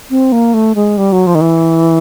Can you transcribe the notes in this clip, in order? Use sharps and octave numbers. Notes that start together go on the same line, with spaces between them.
C4
A#3
A3
G#3
G3
F#3
F3
D#3
E3